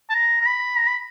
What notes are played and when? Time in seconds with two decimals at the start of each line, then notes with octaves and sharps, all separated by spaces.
0.10 A5
0.14 A#5
0.41 A#5
0.46 B5
0.78 A#5
0.87 B5